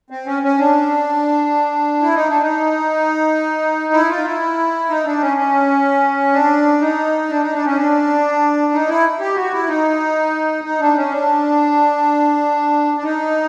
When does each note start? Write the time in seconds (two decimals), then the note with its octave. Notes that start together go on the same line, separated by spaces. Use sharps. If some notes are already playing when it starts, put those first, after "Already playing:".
0.10 C4
0.26 C#4
0.43 C#4
0.58 D4
2.02 E4
2.15 D#4
2.29 D4
2.42 D#4
3.93 E4
4.09 F4
4.25 E4
4.89 D#4
5.05 D4
5.21 C#4
5.37 C#4
6.33 D4
6.81 D#4
7.29 D4
7.41 D#4
7.53 D4
7.65 C#4
7.76 D4
8.73 D#4
8.88 E4
9.20 G4
9.36 F#4
9.52 E4
9.68 D#4
10.64 D#4
10.80 D4
10.96 C#4
11.12 D4
12.97 D4
13.03 D#4